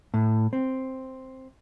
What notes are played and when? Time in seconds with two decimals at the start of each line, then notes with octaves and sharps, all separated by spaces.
0.14 A2
0.53 C4